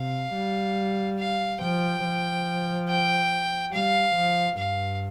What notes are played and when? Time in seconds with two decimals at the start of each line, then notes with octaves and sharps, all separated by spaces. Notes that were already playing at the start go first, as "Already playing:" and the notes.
Already playing: C3 F5
0.34 G3
1.19 F5
1.61 F3 G5
2.04 F3
2.89 G5
3.72 G3 F5
4.16 F3
4.58 G2 F5